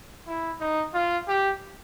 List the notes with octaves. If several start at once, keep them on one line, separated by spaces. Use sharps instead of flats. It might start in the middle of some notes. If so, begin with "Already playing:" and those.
E4
D#4
F4
G4